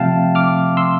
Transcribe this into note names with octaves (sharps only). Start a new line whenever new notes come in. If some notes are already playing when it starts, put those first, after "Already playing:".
Already playing: C3 F3 A3 C4 E5 F5 G5 A5
D6 F6
C6 E6